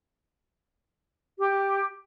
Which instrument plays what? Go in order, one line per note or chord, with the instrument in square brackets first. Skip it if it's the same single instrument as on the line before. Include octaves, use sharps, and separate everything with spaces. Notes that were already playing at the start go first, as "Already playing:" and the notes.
[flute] G4